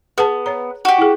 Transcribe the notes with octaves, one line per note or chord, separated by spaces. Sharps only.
B3 G#4 F#5 A5
B4 C#5 A#5
F#4 G4
E4 G#4